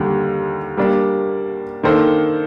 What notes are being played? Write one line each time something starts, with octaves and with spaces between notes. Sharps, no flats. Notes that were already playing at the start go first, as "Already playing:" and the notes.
Already playing: D#2 D3 G3
G3 A#3 D4
D#3 A#3 D4 A4 C5